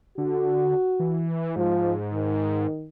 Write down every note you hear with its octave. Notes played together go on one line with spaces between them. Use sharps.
D3 F#4
E3
G#2 F3
D#3